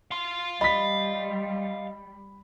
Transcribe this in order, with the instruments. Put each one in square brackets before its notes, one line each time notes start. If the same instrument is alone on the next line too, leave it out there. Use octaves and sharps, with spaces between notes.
[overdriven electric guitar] F5 C6
[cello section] G3 [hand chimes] D#5 [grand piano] B5 B6